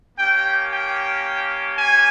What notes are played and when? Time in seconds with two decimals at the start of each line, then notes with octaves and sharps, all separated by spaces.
0.17 A#3 C#4 G4 G5
0.70 G5
1.75 G#5